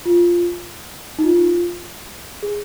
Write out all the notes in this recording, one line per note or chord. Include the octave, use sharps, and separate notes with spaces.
F4
D#4
F4
G#4